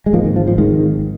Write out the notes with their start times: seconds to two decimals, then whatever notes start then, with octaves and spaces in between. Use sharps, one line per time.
0.06 G#3
0.13 G#1 G#2 F3 A#3
0.24 D#3
0.36 F3
0.47 F3
0.58 G#1 G#2 D#3 G#3